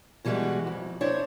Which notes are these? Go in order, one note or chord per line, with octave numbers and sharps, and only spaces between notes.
B2 E3 G3 G#3 F#4
F2
D4 E4 C5 C#5